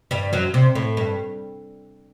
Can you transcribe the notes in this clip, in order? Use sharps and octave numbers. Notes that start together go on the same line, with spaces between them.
G2 G3
F#2 F#3
C3
A2
G2